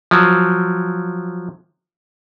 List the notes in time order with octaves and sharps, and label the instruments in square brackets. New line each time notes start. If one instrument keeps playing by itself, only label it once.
[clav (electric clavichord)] F3 F#3